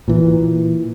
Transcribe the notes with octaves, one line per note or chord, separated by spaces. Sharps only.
A#2 E3